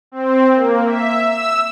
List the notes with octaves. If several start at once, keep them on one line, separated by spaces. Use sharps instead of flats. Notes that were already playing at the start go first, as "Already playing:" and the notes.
C4
A#3
E5
E6